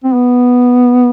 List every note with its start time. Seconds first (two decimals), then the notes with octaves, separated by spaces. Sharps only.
0.04 C4
0.14 B3